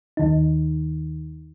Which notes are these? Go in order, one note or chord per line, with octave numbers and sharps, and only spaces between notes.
D#2 D#3 D#4